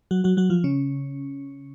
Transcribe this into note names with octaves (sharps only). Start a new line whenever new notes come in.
F#3 F#4
F#3 F#4
F#3 F#4
F3 F4
C#3 C#4